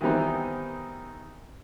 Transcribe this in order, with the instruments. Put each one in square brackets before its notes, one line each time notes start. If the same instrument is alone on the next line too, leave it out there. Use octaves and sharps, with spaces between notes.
[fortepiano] D#3 E3 G3 B3 C4 D#4